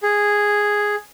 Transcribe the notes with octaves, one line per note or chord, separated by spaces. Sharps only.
G#4